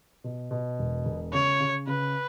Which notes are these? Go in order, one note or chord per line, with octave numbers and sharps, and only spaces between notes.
B2
B2
E1
E1
C#3 C#5
C#3
C#3 B4